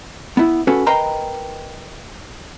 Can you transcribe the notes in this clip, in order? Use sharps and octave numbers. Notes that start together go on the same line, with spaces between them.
B3 E4
C#4 F#4 A4 B4
A#4 B4 D#5 G5 A#5 C6